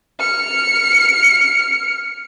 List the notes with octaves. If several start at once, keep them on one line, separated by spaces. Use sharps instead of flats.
F6 C#7